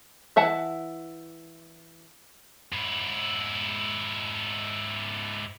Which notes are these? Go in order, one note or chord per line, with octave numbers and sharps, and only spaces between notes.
E3 E5 F#5 A5
G#2 E4